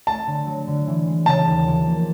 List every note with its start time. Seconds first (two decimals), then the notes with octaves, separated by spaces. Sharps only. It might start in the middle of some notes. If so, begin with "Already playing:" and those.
0.07 A3 A5
0.27 D3
0.46 F#3
0.67 D3
0.87 E3
1.07 G#3
1.26 C#3 A5
1.47 D#2
1.66 F3
1.85 A#3